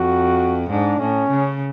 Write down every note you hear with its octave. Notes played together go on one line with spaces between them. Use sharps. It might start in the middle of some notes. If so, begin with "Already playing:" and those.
Already playing: F2 F#4
G#2 D4
A2 C#4
C#3